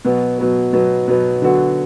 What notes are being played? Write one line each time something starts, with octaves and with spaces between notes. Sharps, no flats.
B2 F#3 B3
B2 F#3 B3
B2 F#3 B3
B2 F#3 B3
D3 F#3 B3 F#4